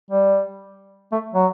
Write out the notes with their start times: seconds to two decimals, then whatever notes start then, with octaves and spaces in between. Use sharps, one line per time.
0.11 G3
1.12 A3
1.34 F#3